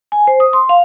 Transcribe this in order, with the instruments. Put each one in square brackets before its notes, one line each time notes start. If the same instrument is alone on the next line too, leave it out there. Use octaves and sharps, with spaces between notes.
[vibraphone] G#5
C5
D#6
C6
F5